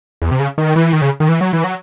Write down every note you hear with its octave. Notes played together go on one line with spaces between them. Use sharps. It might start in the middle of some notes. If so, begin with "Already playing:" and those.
E2
C3
C#3
D#3
E3
D#3
C#3
D#3
E3
F#3
E3
F#3